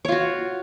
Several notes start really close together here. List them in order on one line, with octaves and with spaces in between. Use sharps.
C#5 F4 F#4